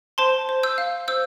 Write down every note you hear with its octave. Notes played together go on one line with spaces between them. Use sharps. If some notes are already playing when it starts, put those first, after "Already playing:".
C5 A5 C6
C5
E6 G6
F5
C5 E6 G6